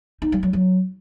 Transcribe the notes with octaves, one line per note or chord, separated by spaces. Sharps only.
D#4
G3
F#3
F#3